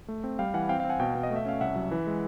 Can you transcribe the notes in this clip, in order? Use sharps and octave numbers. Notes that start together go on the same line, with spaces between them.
A3
C4
G3 F5 G5
E3 F#5 G#5
C4 F5 G5
F5 G5
C4
F#5 G#5
B2 F5 G5
B2
D#5
A3
E5
C#4 F5
C2 E5 F#5
F#3
E3
G#3